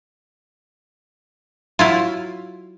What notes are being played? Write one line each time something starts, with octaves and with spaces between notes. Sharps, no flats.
F#3 E4 F4